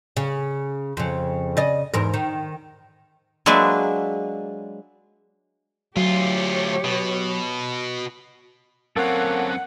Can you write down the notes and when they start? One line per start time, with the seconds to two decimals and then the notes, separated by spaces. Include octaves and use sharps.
0.17 C#3
0.97 F2 C#3
1.57 C#3 D5 D#5
1.94 E2 G#2 A#4
2.14 D#3
3.46 F#3 G#3 A#3 D4 B4 E5
5.97 D2 F#3 F4 G4 C#5
6.84 B2
8.96 F#2 A#3 C4 A4 C#5 F#5